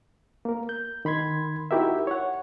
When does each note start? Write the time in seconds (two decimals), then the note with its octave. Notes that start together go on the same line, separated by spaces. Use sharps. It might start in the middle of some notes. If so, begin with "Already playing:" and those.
0.45 A#3 A#4
0.69 G6
1.05 D#3 B5 C6 G#6
1.71 D#4 E4 F#4 G4 A#4 E5
2.07 C#5 F#5